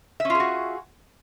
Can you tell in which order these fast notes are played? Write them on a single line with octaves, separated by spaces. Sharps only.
E5 C#4 F4 G#4 F#4